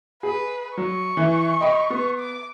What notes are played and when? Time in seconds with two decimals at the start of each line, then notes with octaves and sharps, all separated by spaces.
0.23 G#4 B4
0.78 F#3 C#6
1.17 E3
1.61 D#5 G5 B5
1.90 B3
2.19 D6